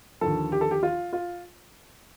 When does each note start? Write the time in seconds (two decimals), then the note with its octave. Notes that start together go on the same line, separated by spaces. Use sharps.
0.21 D#2 D3 F3 A4
0.52 G4
0.61 A4
0.71 G4
0.83 F4
1.13 F4